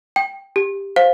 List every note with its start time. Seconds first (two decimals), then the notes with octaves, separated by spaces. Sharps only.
0.16 G5
0.56 G4
0.96 C5 F5